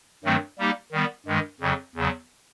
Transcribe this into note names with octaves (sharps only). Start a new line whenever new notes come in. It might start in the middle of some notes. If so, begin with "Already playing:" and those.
G2 D#3 F#3 A3 C4
G3 A#3 D#4 G4
D#3 G3 B3
G2 D#3 G#3
F2 C#3 F#3
E2 C#3 F#3